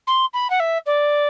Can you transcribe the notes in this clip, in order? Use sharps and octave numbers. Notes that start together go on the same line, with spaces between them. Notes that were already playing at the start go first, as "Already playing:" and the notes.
C6
B5
F#5
E5
D5